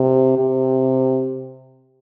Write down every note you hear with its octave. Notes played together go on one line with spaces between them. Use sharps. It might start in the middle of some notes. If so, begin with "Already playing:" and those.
Already playing: C3
C3